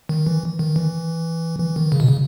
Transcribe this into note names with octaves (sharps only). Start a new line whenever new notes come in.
D#3
E3
D#3
E3
E3
D#3
C#3
B2
C#3